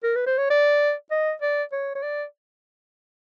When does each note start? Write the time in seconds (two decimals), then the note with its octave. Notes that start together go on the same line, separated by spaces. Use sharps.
0.03 A#4
0.16 B4
0.27 C5
0.38 C#5
0.50 D5
1.11 D#5
1.42 D5
1.72 C#5
1.95 C#5
2.02 D5